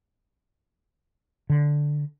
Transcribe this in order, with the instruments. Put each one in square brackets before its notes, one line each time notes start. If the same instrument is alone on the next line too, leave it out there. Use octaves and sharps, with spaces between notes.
[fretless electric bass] D3